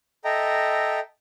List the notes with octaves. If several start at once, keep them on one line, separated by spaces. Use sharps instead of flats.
A4 D#5 E5 G5 A#5